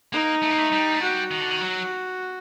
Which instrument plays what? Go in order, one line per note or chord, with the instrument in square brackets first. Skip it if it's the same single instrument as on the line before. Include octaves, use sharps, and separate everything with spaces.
[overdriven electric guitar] A#3 [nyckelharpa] D#4
[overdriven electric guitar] A3
A#3
A3
G3
A3
[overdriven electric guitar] G3 [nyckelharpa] F#4
[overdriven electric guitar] D#3
D3
D#3
F#3